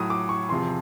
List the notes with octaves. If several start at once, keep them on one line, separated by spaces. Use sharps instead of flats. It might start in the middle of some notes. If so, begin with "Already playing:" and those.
Already playing: A2 F#3 D#6
D6
C#6
E2 C3 F3 C6